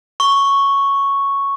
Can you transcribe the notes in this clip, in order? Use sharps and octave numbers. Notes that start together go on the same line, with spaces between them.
C#6